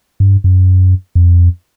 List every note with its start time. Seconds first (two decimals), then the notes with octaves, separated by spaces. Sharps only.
0.20 G2
0.44 F#2
1.15 F2